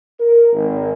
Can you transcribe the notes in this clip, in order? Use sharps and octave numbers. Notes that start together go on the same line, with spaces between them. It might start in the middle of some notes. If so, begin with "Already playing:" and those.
A#4
G#1